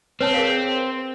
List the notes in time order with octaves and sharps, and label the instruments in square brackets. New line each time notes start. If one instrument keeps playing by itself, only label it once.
[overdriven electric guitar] C4 [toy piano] B4 C#5 A5
[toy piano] G#4 A#4 F5